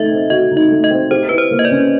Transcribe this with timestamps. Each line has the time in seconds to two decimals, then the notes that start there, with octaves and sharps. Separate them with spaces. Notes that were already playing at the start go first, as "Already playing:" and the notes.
Already playing: A3 D#4 D#5 E5
0.11 C4
0.30 F#4 D#5
0.51 D#4
0.57 D#5
0.71 A3
0.84 D#5
0.91 C4
1.11 G4 C5
1.29 E4 B4
1.38 C5
1.51 A#3
1.59 D#5
1.65 D5
1.71 C#4